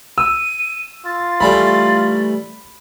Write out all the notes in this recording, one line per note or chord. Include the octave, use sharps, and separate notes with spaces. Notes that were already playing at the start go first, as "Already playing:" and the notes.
E6 D#7
F4 A6
E3 G3 A3 B5